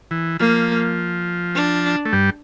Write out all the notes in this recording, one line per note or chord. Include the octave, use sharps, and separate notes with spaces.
E3
F3 A#3
D4
A3
G2 G3